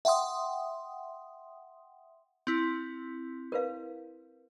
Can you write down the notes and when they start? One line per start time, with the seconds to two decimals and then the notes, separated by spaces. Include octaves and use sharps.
0.05 E5 F#5 G5 C6 D#6
2.47 C4 E4
3.52 A#4 B4 F5